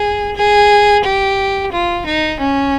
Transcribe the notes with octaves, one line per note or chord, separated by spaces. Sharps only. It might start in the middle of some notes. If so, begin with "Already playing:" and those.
Already playing: G#4
G#4
G4
F4
D#4
C#4